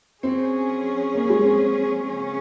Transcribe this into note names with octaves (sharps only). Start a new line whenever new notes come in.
F#3 C4 C#4 G#4
A#3
G#3
C4
C#3 F#3 C#4 G#4